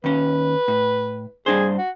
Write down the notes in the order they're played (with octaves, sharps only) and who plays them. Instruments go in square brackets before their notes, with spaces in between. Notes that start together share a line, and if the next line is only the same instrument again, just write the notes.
[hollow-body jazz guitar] D#2 C#4 [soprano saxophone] B4
[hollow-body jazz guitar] A2
[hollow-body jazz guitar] G2 D4 C5 [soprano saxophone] G#4
[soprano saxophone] F#4